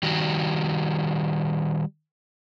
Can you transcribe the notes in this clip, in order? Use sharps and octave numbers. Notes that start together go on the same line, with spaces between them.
D#3 G3 F#4